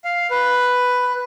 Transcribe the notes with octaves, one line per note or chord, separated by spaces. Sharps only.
F5
B4